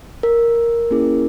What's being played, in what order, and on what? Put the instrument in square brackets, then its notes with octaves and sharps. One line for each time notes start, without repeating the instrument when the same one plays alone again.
[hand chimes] A#4
A#3 C#4 E4 G#4